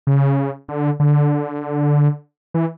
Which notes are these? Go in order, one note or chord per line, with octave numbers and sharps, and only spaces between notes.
C#3
D3
D3
E3